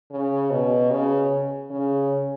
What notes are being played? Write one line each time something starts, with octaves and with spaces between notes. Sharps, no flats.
C#3
B2
C#3
C#3